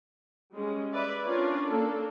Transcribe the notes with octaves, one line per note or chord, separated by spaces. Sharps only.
G3 G#3 C#4
B4 D5 E5
C#4 D4 F4 A#4 C#5 D5
A#3 D4 A4